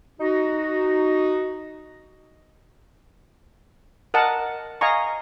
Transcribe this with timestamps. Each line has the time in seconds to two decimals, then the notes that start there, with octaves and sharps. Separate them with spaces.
0.20 D#4 F#4
4.14 A#4 D#5 F#5 A5
4.81 D#5 F5 G#5 A#5 C#6